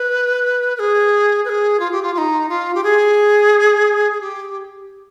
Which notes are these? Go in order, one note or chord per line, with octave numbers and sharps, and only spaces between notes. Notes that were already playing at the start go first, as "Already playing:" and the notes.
Already playing: B4
B4
G#4
B4
G#4
F4
G4
F4
F4
D#4
F4
G4
G#4
G#4
G4